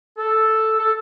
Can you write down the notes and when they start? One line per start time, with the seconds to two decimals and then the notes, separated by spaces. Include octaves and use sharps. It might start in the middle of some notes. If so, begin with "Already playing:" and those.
0.17 A4
0.79 A4